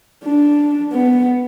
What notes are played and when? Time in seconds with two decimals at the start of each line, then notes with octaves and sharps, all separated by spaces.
0.24 D4
0.92 B3